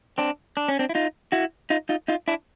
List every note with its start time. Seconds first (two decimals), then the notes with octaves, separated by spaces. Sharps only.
0.18 C4 D4
0.57 D4
0.68 C#4
0.79 C4 D4
0.89 E4
0.95 D#4 F4
1.32 E4 F#4
1.70 D#4 F4
1.89 D#4 F4
2.08 D#4 F4
2.28 D4 E4